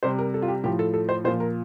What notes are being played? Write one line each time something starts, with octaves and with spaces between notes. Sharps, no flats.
C3 G3 C5
A#4
A4
F4
G4
A2 F3 G4
A4
A4
C5
A#2 F3 C5
A#4